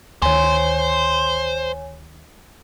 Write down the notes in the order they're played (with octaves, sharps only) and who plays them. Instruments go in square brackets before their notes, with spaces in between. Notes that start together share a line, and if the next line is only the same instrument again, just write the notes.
[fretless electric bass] D2 D#3 [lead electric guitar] C5 [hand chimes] C#5 G#5